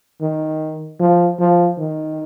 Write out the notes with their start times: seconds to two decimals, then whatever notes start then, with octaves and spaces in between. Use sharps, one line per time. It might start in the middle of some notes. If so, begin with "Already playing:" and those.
0.21 D#3
1.00 F3
1.40 F3
1.78 D#3